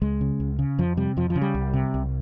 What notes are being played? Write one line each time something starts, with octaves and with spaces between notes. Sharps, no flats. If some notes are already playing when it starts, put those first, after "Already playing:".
C#2 G#3
C#3
C#2
C#3
F2 F3
C3 G3
F2 F3
F3
C#3
G3
C2
C3
C2